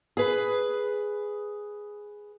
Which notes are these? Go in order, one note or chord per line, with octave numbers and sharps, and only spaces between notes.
G#4 B4